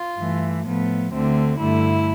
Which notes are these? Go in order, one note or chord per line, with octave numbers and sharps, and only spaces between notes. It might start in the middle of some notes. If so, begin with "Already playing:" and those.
Already playing: F4
G2 E3 A3
A2 F3 B3
D2 D3 A3 C4
G2 D3 A3 E4